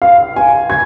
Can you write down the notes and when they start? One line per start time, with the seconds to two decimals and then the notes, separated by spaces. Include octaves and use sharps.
0.02 F5
0.36 G#5
0.70 G#6